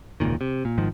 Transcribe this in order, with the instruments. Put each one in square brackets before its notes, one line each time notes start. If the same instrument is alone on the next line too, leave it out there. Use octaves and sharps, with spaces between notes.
[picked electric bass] E1 C#2 A#2 D#3
C3
A#2
G#1 G#2 D#3 F3